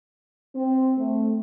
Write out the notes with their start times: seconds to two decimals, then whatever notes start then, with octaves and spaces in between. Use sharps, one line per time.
0.55 C4
0.98 A3